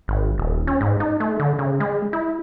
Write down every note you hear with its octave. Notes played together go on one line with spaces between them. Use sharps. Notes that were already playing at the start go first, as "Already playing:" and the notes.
G#1
D#1
C#4
G#2
D#4
A3
D3
C#3
G#3
E4